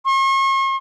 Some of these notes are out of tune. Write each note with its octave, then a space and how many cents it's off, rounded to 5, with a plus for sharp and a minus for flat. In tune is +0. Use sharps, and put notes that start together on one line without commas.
C#6 -45